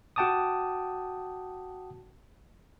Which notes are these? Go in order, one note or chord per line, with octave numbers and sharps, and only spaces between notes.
F#4 F#5 G5 A5 D6 D#6